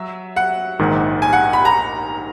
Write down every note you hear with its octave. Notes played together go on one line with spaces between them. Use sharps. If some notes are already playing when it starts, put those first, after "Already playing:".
Already playing: F#3 E5
F#5
A#1 G#2 D#3
G#5
F#5
B5
A#5